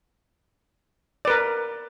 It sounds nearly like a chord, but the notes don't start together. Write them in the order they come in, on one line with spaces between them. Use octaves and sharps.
D5 B4 A#4